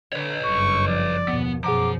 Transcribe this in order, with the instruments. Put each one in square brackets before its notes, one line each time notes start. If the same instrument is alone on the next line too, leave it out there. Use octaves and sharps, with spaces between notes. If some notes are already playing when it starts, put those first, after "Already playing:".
[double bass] D3 [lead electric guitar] B4 C#5
[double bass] F#1 G2 [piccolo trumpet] C#6
[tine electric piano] F3 [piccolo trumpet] D5
[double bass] D#2 B2 [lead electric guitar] B3
[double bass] F#2 B2 [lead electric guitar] F3 [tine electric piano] G#4 F#5 A#5 [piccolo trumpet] D6